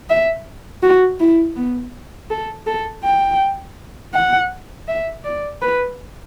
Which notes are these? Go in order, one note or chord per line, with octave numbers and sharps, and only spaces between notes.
E5
F#4
E4
B3
A4
A4
G5
F#5
E5
D5
B4